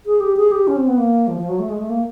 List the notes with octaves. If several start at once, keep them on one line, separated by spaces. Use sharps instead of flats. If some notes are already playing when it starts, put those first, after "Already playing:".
G#4
G4
G#4
G4
C#4
C4
B3
A#3
F3
F3
F#3
A3
G#3
A3
A#3